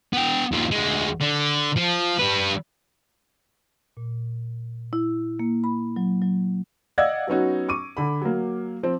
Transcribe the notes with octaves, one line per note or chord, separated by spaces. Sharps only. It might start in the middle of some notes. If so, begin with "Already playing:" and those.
B3 G5
D#2 F3
D2 G#3
D3
F3
G3 B4
A#2
E4
A#3
B5
F#3
F#3
D5 D#5 F5 F#5 E6 G#6
F#3 B3 C#4 D#4 F#4
C#6 D6 D#7
D3 B5
F#3 A#3
F3 C4